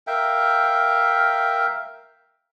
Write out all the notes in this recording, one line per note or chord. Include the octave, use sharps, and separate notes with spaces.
A#4 E5 F5 G5